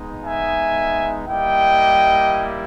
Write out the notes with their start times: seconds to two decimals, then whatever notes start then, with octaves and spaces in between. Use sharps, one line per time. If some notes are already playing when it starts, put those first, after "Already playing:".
Already playing: G#3 B3 D#4
0.25 E5 G#5
1.27 G3 A#3 E4 D#5 G5